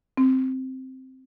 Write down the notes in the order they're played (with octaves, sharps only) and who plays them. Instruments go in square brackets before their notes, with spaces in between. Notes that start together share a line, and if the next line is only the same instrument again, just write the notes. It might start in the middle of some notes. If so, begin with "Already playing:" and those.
[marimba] C4